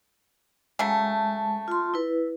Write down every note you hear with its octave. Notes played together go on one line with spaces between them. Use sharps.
C#3 F#3 G#3 A3 A5
F4 C6
E4 B4